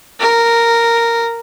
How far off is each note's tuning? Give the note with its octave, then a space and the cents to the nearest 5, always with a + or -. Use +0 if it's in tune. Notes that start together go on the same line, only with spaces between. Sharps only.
A#4 -5